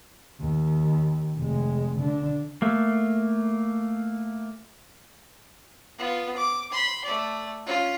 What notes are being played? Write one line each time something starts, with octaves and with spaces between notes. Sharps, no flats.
D#2
F1 G#3
D3 D4
A3 A#3
B3 F4
D6
B5 C6
A3 D5
C#4 F4